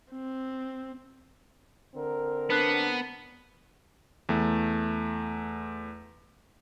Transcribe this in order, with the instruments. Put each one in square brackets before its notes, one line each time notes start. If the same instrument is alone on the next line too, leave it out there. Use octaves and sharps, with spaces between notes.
[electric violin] C4
[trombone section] D3 C4 A#4
[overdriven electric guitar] B3 [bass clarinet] D4 [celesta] B4 F#6 C7
[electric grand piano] E2 A3